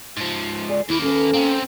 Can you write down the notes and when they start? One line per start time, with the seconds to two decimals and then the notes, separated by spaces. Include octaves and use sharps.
0.17 G#2 F3
0.69 G#4 D5
0.89 D#2 A#3 E4
1.02 C#4 A4 B4
1.33 C#3 A#3 C4 A#5